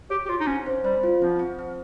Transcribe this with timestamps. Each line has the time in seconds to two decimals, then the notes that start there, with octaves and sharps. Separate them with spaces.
0.10 G4 C#5
0.25 G4
0.29 F4 C#5
0.40 D#4
0.47 C4 C#4
0.66 C5
0.84 G3 C5
1.03 F4
1.21 F3 C4
1.39 C4
1.59 C4